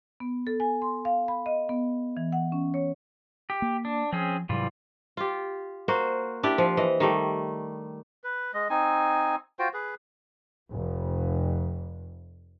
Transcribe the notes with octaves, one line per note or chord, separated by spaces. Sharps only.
B3
A4
G#5
C6
F5
B5
D#5
B3
E3
F#5
C#4
C#5
G4
A#3
D4
F3 C4 C#4 G#4
G#2 C3 E3 F#3 G3 F4
F4 G4
A#3 F#4 C5
D4 E4 G4 D5
F3
E3 D#5
D#3 G3 A3
B4
G#3 D#5
C4 D#4 G#5
F4 F#4 C5 G5
G#4 B4
F1 F2